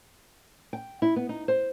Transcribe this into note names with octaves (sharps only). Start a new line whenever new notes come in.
G5
E4
B3
D#4
C5